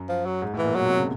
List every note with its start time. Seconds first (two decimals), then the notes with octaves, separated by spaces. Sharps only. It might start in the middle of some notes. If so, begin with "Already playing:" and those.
Already playing: F#2
0.09 F3
0.26 F#3
0.42 G#2
0.53 A2
0.59 E3
0.64 A#2
0.75 B2 F#3
0.86 C3
0.98 C#3